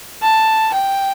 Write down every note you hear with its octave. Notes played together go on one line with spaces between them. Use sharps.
A5
G5